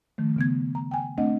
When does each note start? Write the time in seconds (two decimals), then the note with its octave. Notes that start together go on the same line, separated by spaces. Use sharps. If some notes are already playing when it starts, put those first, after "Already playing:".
0.18 D#3 F3 A3
0.36 C#3 B3 G#6
0.75 A#5
0.91 G5 G#5
1.18 A3 C4 D4 D#5 F#5